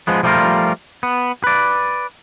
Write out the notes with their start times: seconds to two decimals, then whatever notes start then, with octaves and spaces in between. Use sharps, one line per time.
0.07 F3 G#3 B3
0.23 F3 G3 A3 B3 F4 A#4
1.03 B3
1.44 B4 D5